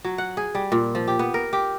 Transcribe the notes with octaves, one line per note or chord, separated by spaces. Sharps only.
F#3
F#5
G#4
G3
A#2
F3
G4
B3
A#4
G4